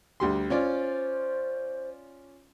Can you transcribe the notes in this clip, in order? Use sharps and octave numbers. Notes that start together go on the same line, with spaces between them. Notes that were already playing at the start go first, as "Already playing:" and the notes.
D2 G3 C6
C#4 F4 C5 D5